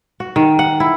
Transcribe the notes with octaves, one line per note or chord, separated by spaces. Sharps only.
F#4
D#3
F#5
E4